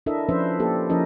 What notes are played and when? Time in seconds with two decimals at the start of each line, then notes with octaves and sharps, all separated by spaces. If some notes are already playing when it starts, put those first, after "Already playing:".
0.06 D4 E4 A4 A#4 D#5 E5
0.29 F3 C#4 D4 B4 C5 E5
0.59 A#3 G4 A4
0.90 F3 C#4 D#4 E4 A#4 D#5